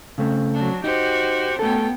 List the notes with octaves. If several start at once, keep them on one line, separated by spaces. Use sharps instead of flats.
C#3 A3 C4
F#3 D4
D#4 F#4 G4 C5
F#2 A3 B3 A4 G5